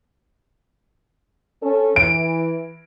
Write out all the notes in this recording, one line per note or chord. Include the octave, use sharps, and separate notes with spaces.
C#4 A4
E3 D7